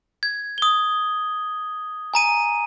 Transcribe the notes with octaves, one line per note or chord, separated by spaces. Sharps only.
G#6
D#6 G7
G#5 A#5 D#7